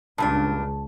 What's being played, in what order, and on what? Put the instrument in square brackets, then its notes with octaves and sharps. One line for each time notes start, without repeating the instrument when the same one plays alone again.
[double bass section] C#2 [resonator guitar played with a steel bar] G2 A#2 D4 [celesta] A5